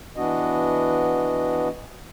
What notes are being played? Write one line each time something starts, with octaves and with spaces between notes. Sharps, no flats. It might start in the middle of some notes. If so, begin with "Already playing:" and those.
E3 B3 D4 F#4 D#5